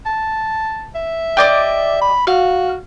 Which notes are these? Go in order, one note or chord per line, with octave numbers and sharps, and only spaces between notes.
A5
E5
G4 D5 D#5
B5
F#4 F5